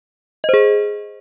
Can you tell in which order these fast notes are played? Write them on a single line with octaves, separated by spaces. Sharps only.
D#5 C5 G#4